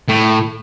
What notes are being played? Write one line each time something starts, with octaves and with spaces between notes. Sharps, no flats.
A2